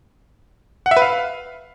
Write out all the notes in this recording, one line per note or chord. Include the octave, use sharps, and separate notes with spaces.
F#5
E5
B4
F5